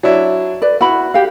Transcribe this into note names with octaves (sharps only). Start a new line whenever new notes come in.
F#3 D4 E4
B4 D5
E4 F#4 B5
G4 F5